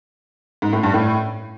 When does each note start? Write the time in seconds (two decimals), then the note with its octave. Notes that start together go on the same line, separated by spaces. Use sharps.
0.62 G#2
0.73 A2
0.83 G2
0.94 A2